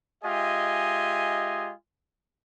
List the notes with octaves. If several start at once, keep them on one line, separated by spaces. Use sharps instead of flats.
G#3 F4 G4 D#5 E5 G#5